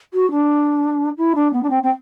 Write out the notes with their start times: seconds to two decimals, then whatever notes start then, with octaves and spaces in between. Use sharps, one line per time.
0.14 F#4
0.31 D4
1.17 E4
1.35 D4
1.53 B3
1.63 D4
1.70 C4
1.83 C4